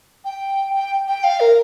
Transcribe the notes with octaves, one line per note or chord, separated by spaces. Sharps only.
G5
G5
G5
F5
A#4